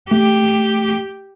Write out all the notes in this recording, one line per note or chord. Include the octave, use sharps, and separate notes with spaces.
A3 G4